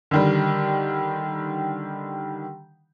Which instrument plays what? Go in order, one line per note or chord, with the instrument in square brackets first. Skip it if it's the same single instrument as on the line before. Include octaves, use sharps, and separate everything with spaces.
[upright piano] D3 D#3 G3